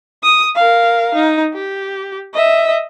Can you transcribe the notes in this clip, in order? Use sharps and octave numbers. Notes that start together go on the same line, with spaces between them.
D#6
A#4 F5
D#4
G4
D#5 E5